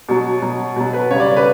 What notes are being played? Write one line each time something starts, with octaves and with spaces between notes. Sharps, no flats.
B2 F#3
B2 F#3
B2 F#3
B4
C#3 G3 C#5
D5
B4